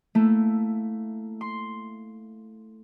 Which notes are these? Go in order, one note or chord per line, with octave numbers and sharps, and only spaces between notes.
A3 A#3 E4
C6